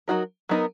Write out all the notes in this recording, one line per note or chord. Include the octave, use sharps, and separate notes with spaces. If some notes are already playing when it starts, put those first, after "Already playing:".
F#3 B3 D#4 F#4 A#4
F#3 B3 D#4 F#4 A#4